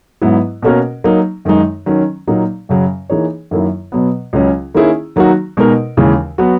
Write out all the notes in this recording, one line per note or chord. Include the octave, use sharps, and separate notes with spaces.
G#2 F#3 B3 E4
B2 A#3 C#4 F#4 A#4
F#3 A#3 D#4
F#2 D#3 G#3 D#4
D#3 F#3 C#4
A#2 F#3 A#3 D#4
F#2 C#3 F#3 C#4
E3 A#3 D#4 G#4 C#5
F#2 D#3 F#3 A#3 E4
B2 F#3 B3
C#2 C#3 F#3 C#4
D#3 A#3 C#4 E4 G#4
D#3 F#3 A#3 D#4 F#4
B2 G#3 D#4 A#4
D#2 C#3 E3 G#3
F#3 B3 F#4